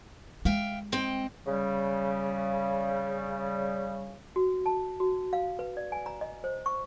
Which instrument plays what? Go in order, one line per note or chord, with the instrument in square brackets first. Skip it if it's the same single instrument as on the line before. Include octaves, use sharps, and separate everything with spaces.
[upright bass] G#3 [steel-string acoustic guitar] E5 F5 G5
[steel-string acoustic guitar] C4 D#5 G5
[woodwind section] C#3 G3
[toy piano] F#4
A5
F#4
F5
B4
D5
G#5
A#5
D#5
C5
C#6